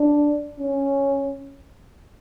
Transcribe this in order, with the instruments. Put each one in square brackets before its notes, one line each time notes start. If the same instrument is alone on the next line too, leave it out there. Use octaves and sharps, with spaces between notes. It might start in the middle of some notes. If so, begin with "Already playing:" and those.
Already playing: [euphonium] D4
C#4